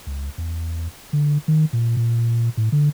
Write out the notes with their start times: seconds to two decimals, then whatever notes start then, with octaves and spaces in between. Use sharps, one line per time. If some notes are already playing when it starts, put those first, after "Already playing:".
0.07 C#2
0.38 E2
1.13 D3
1.48 D#3
1.73 A#2
1.97 A#2
2.57 A2
2.72 D3